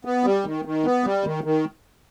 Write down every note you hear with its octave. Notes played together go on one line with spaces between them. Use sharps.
B3
G3
D#3
D#3
B3
G3
D#3
D#3